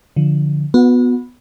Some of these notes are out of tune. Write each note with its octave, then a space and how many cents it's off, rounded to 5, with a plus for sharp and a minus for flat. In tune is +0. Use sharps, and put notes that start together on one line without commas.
D3 +0 F3 +0
B3 +0 F#4 -30